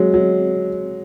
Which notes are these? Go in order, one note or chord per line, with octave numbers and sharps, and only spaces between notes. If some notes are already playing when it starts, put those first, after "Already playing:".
Already playing: F#3 G#3
F#3